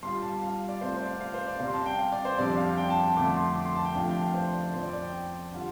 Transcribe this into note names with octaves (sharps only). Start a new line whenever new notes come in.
G2 G3 F4 C6
A5
F5
D5
C3 A3 C4 F4 C5
C5
D5
F5
F5
C5
D5
C3 G3 C4 F5
C6
A5
G5
F5
D5
C5
F2 C3 G3 D4 D5
F5
G5
A5
F2 D3 A3 D6
C6
D6
C6
A5
G5
F2 C3 F3 A3 D4 F5
G5
F5
C5
D5
F2 F3 C4 C5
D5
D5
G5
D3 G3 F4